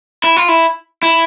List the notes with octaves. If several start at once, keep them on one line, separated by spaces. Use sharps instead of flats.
E4
F4
E4
E4